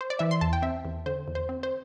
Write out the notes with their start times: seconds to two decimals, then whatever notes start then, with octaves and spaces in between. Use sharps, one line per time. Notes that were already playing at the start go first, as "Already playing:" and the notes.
0.01 C5
0.10 D5
0.19 E3 E5
0.31 C6
0.41 E2 A5
0.53 G5
0.62 C4 E5
0.85 E2
1.06 D3 C5
1.28 E2
1.35 C5
1.49 C4
1.63 C5